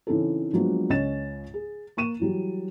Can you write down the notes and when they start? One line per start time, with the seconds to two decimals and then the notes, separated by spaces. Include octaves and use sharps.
0.07 C#3 E3 C4 D#4 E4 A4
0.53 F3 F#3 G#3 A#3 B3 D4
0.90 C#2 C#4 D#5 A6 E7
1.54 G#4
1.97 A#3 C#6 D#7 E7
2.19 E3 F#3 G3